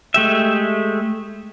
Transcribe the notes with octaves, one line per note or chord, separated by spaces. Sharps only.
G#3 A3 G4 E5